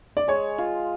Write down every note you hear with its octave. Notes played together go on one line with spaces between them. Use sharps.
D5
G#3 C#5
F4